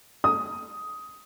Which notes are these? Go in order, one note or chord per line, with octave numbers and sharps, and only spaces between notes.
D#6